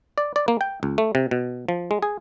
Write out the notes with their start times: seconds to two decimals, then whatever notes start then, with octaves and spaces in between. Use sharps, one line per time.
0.18 D5
0.36 D5
0.48 A#3
0.61 G5
0.83 C#2
0.98 A3
1.15 C3
1.31 B2
1.69 F3
1.91 G#3
2.02 G#4